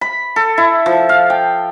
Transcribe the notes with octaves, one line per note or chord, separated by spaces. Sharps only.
B5
A4
E4
F3
F5
G5